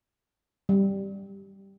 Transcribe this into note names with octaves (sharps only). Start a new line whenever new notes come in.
G3